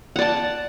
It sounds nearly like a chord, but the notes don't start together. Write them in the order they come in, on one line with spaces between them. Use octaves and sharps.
F#5 D5 A5